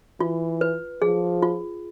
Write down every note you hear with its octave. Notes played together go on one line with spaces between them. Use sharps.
E3 F4
B4
F3 G#4
F4